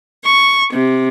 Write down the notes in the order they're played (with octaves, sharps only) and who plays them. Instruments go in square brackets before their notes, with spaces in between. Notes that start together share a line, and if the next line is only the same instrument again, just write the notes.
[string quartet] C#6
C3